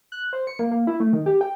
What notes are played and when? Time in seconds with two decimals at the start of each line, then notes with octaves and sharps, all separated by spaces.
0.12 F#6
0.33 C5
0.47 C#7
0.59 A#3
0.71 A#3
0.87 E4
1.00 A3
1.13 D#3
1.26 G4
1.41 G5